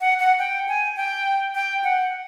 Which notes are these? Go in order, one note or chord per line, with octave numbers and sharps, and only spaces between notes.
F#5
F#5
G5
G#5
G5
G5
F#5